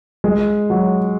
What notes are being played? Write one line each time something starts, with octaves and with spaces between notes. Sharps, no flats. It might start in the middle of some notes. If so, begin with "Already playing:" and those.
G#3
F#3